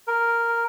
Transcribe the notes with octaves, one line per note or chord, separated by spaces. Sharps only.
A#4